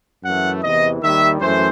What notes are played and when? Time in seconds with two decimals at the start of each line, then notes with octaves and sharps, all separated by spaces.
0.24 F#2 E3 A3 F#5
0.63 E2 C3 E3 D#5
1.02 D#2 D#3 G3 E5
1.41 F#2 E3 A3 C5